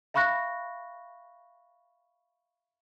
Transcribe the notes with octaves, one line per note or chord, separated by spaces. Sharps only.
E5 F5 B5 C#6 F#6 A#6